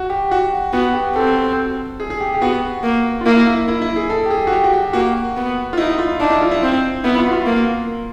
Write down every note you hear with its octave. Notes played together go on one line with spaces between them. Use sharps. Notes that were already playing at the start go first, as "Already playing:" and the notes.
Already playing: F#4
G4
F#4
B3 F#4
G4
C4 A4
G#4
G#4
G4
G4
B3 F#4
A#3
F4
A#3 E4
E4
E4
E4
G#4
A4
G4
G#4
F#4
G4
F#4
G4
A#3 F#4
B3
F4
D#4 E4
F4
D4 D#4
E4
F4
E4
C4
B3 E4
F4
F#4
F4
A#3